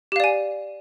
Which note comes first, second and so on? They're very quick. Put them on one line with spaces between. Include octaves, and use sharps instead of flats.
G4 F5 D5 G#5